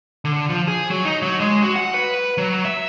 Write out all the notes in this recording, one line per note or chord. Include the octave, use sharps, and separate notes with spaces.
D3
F3
G#4
F#3
D#4
F#3
G#3
F#4
F#5
B4
F#3
E5